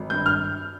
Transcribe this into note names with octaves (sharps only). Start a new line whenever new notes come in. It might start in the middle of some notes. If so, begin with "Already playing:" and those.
Already playing: G#1
G2 G6
F6